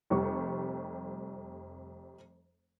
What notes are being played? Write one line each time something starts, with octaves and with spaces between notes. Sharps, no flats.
F1 F2 G3 C4 G4 C#6